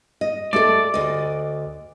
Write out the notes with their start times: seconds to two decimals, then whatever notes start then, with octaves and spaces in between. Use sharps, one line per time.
0.21 D#5
0.53 A3 G4 A4 D5
0.94 D2 D#5